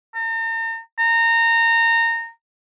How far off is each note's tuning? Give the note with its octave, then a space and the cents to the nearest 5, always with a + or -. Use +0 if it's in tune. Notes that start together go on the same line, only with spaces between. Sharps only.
A#5 -45
A#5 -25